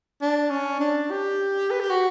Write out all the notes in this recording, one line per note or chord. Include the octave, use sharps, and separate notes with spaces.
D4
C#4
D4
G4
B4
G4
F#4